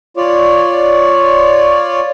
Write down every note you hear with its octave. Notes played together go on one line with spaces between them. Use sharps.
F4 C#5 D5